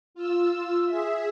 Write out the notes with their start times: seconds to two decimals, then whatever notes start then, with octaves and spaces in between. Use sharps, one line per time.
0.14 F4 E6
0.86 G#4 E5